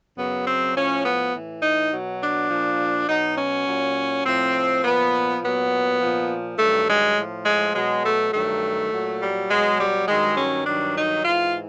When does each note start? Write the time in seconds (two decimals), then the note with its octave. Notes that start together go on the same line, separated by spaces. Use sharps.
0.17 F#2 C#3 F#3 B3
0.46 C4
0.75 A2 F3 C#4
1.05 B3
1.33 A2 E3
1.63 D#4
1.92 B2 F#3
2.22 D4
2.50 A#2 F3
3.09 B2 F#3 D#4
3.38 C#4
3.67 A#2 F#3
4.26 A2 F3 C4
4.84 A#2 F3 B3
5.42 A#2 F#3 B3
6.00 A#2 F3
6.58 G2 D#3 F#3 A3
6.88 G#3
7.17 A2 F3
7.46 G#3
7.75 B2 F#3 G#3
8.04 A3
8.34 G2 D#3 F#3 A3
8.92 A#2 F#3
9.21 G3
9.50 B2 F#3 G#3
9.79 G3
10.08 G2 D#3 F#3 G#3
10.37 C#4
10.66 G2 D#3 F#3 D4
10.96 D#4
11.24 G#2 E3 F4